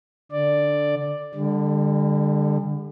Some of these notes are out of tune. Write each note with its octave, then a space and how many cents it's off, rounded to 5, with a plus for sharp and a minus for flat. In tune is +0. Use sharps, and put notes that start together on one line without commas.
D3 +0 D5 +5
D3 +15 G3 +45